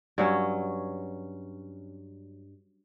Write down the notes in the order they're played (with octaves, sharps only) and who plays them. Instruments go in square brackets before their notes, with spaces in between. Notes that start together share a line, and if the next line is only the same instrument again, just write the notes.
[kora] G2 F#3 C#4